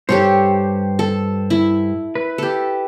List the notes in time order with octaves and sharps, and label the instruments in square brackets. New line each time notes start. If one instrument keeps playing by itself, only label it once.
[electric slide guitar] G2 C5 [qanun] G4 A4 C#5
[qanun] A4
E4
[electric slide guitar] B4
[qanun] G4 A4